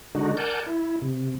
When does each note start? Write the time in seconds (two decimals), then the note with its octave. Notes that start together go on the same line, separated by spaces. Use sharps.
0.15 D3 G#3 D4 D#4 F#4
0.37 A#4 D5 F#5 G#5 A5 G6
0.66 E4
1.02 C3